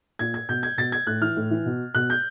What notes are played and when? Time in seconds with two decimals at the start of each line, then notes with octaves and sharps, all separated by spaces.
0.19 A#2 G#6
0.34 G#6
0.49 B2 G6
0.63 G#6
0.78 B2 A6
0.92 G#6
1.07 A2 F#6
1.21 E3 F6
1.36 A2
1.51 E3
1.66 B2
1.95 B2 F#6
2.10 G6